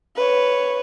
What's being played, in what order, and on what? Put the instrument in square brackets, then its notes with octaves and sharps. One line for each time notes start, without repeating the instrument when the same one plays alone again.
[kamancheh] B4 C#5